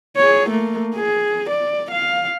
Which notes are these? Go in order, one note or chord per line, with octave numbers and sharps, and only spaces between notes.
G#4 C#5
A3 A#3
G#4
D5
F5